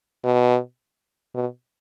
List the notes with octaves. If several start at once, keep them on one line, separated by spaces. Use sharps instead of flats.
B2
B2